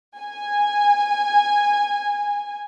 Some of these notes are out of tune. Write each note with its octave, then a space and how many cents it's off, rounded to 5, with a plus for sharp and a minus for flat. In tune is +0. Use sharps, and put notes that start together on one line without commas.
G#5 -10